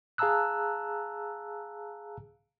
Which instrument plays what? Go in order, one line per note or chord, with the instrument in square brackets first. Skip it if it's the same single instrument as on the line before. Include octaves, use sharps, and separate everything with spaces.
[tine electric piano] G#4 F5 A5 A#5 E6 F#6